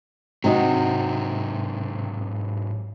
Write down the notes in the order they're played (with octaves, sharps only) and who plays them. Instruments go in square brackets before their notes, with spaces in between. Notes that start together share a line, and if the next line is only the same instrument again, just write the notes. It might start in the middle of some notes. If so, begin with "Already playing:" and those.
[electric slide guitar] G#2 F#3 [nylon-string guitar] C3 D#4 F#4